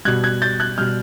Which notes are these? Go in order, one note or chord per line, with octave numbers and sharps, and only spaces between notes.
B2 G3 F#6 G#6
F#6 G#6
G6 A6
F#6 G#6
B2 G3 F6 G6